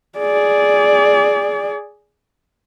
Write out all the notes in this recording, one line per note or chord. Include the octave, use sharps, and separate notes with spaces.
G#4 D5